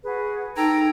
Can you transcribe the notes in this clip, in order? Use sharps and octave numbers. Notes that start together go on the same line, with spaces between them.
F#4 G#4 B4
D#4 A4 G5 A#5 G#6